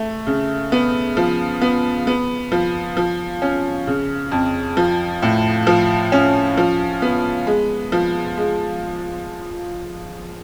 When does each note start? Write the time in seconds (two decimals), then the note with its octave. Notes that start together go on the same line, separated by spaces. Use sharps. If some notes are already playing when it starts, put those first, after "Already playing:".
Already playing: A3
0.27 C#3
0.72 B3
1.17 F3
1.61 B3
2.07 B3
2.52 F3
2.97 F3
3.42 C#4
3.87 C#3
4.32 F2
4.77 F3
5.22 A2
5.67 F3
6.12 C#4
6.57 F3
7.02 B3
7.47 G#3
7.92 F3
8.37 G#3